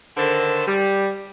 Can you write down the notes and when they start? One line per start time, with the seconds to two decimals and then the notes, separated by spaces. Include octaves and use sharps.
0.17 D3 D#3 A4 C5
0.67 G3